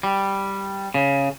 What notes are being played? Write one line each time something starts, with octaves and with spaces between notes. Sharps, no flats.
G3
C#3